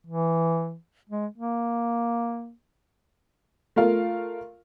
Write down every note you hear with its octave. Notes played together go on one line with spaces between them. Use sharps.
E3
G#3
A#3
A3 F4 A#4 F5